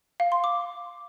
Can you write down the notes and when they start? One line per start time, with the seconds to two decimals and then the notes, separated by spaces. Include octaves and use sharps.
0.20 F5
0.32 C6
0.44 D6